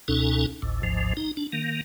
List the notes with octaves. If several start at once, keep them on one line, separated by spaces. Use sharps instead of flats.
C#2 B2 C#4 D#4 A4
G#1 D2 A2
G#1 D2 G#2 F3
D#4
D4
D#3 A#3